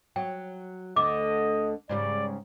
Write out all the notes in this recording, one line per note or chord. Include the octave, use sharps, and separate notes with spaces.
F#3 G5
D2 D3 D#5 D6
G#2 C#3 G3 D5